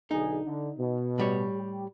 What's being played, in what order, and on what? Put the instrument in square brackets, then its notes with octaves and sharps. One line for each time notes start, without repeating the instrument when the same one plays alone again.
[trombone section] B1 D3 G#4 [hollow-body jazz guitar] D#4
[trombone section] D3
B2
[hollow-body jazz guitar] A2 G3 C#5
[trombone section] G4